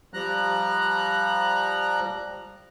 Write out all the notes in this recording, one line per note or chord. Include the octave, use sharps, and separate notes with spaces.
F3 G3 A#5 F#6